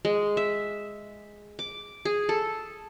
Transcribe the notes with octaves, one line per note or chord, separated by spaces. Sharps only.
G#3
E5
D6
G#4
A4